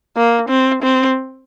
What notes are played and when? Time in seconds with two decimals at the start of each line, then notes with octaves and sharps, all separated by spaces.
0.16 A#3
0.49 C4
0.82 C4